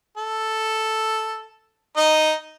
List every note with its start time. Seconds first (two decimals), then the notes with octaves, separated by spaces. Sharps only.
0.18 A4
1.97 D#4 D#5